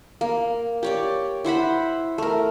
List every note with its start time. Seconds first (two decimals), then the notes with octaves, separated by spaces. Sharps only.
0.21 A#3
0.83 G4 C#5 D5
1.44 E4 C5 F#5 B5
2.18 A3 A#4